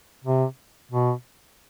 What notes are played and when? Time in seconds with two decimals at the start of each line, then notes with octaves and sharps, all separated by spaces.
0.24 C3
0.92 B2